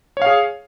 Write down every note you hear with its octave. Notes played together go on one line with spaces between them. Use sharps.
G#4 C#5 F5